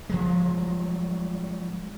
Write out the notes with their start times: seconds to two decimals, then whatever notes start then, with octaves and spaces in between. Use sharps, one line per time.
0.09 F3 F#3 G#3